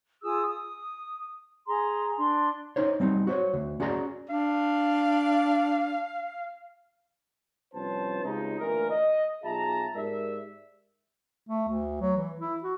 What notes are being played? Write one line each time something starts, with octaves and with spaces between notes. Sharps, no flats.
F4 G#4 D#6 E6
D#6
G#4 A#5 C6
D4 C6
D#4 C5 C#5
G3 C4 D4 D#4
F#4 C5 C#5
D2
C#4 F#4 G#4 D5 G5 A#5
D4 F5
C2 F3 C#4 B4 C5 A5
C#2 C3 D#4
D2 A#2 E3 A#4
D#5
B1 F4 G#4 E5 A5 A#5
G#2 G4 A#4 D5 E5
A3
D2
F#3
E3
E4
F#4